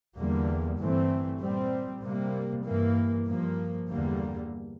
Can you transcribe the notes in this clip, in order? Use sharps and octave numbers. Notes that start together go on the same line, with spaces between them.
E2 D3 G3 A#3
G2 E3 A3 C4
A#2 G3 C4
C3 G3 A#3
G2 E3 A#3
G2 F3 A#3
E2 D3 G3 A#3